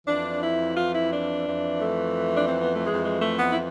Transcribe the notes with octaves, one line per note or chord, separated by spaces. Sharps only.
F2 E3 D4
E4
F4
E4
D4
F2 E3
A3
D4
C4
B3
A3
F2 E3 G#3
G#3
A3
B3
E4